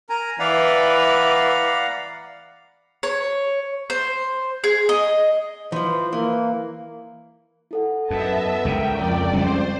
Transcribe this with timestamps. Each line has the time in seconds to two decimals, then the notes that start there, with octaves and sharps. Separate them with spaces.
0.09 A#4 G#5 A#5
0.39 E3 D5 F5 F#5 A#5 B5
3.03 C#5
3.90 C5
4.64 G#4
4.89 D#5
5.72 E3 F3 C5
6.12 E3 A#3
7.71 E4 A4 F#5
8.10 F#2 B3 D#5 E5 A5
8.65 C#2 C#3 A#4 G5
8.95 F2 D5 C#6
9.33 G3 G#3 C#4 C5